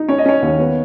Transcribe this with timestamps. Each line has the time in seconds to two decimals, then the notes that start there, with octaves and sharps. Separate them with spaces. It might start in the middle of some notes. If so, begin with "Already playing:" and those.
Already playing: D#4
0.08 C#4 C#5
0.18 D#5
0.25 C#4 C#5
0.42 D#2
0.59 B3